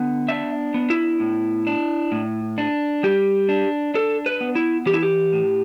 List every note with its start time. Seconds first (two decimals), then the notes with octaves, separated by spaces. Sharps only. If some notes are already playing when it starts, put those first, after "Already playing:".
Already playing: D3 B3
0.28 D4 E5
0.74 B3
0.90 E4
1.20 A2
1.67 D4
2.12 A2
2.58 D4
3.03 G3 G4
3.49 D4
3.94 D4 A4
4.26 B4
4.41 B3
4.55 E4
4.86 E3 G4
4.94 E4
5.03 G4
5.33 A2